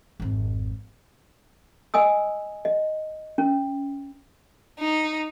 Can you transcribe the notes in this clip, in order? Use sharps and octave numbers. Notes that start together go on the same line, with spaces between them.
G#1 F2
D#5 G#5 D#6 E6
D#5
C#4
D#4